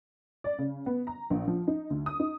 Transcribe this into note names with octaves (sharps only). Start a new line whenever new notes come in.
D5
C#3
B3
A#5
A#1
F3
D#4
D2
D#6
D#4